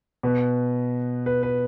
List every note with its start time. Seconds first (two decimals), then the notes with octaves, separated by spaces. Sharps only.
0.23 B2 B4
1.26 B4
1.43 B4